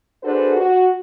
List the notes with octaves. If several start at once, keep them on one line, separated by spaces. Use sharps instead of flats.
D4 F#4 G#4 A4 B4 C5
F#4